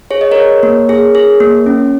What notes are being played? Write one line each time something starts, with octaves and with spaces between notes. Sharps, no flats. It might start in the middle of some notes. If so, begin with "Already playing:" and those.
G#4 C#5
D#5
G#4 A#4 C#5
A#3
G#4
G#4
A#3
C#4